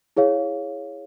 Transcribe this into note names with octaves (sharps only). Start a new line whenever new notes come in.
E4 G#4 C#5 F5